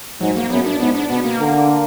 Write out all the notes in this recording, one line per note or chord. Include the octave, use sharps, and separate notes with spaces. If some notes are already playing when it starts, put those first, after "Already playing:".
G#2 F#3
A#3
F#2 B3
D4
G#2 B3
D4
B2 B3
A#3
D3